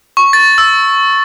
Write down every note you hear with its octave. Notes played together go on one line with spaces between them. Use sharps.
C#6
A6
E6